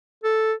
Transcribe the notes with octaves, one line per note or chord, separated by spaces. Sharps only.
A4